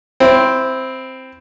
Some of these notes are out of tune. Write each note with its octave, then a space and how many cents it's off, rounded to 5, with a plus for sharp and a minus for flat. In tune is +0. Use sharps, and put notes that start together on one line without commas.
C4 +0 E4 +10